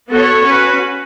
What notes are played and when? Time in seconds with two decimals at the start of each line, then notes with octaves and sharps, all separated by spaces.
0.10 B3 F#4 A4 C#5
0.44 C#4 F#4 B4